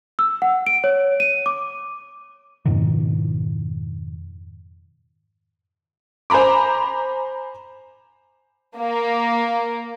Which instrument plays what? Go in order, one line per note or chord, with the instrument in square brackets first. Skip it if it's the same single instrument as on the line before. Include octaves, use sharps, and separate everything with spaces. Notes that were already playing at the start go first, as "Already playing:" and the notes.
[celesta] E6
F#5
D7
C#5
D#7
D6
[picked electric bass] F2 G#2 B2 D#3
[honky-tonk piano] C5 G#5 A#5 B5 D6
[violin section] A#3